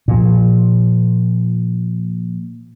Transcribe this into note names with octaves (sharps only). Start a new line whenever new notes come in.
A#2 F3